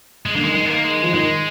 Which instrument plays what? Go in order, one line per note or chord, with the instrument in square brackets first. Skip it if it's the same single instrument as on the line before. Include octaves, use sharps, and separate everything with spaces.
[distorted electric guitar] G#3
[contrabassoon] D3 [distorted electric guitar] A#3
[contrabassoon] D#3 [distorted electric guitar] G#3
[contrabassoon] D#3 [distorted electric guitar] G#3
[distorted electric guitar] B3
A#3
G#3
[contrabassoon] F3
[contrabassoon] D#3 [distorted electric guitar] G#3